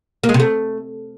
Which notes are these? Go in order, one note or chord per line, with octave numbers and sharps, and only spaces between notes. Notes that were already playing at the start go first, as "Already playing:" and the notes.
A#3
G#3
C3
A3